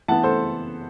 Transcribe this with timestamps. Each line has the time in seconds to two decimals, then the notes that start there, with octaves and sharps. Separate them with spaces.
0.08 E3 B3 F#5 A5
0.24 A4 C5